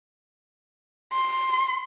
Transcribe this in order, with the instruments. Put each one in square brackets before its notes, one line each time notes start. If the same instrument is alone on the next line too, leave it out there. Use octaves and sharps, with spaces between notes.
[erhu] C6